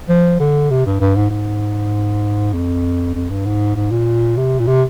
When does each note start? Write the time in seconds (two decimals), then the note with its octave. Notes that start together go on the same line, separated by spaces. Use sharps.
0.09 F3
0.40 D3
0.70 C3
0.86 G2
1.00 G2
1.16 G#2
1.30 G#2
2.54 F2
3.15 F2
3.30 G2
3.46 G#2
3.76 G#2
3.91 A#2
4.37 C3
4.59 A#2
4.67 C3